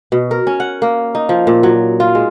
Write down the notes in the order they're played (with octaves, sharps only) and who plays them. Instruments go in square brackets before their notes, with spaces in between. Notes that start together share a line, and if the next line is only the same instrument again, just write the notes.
[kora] B2
A#4
C#4
F#5
A#3
D#4
F3
A#2
F#3
F4
G#3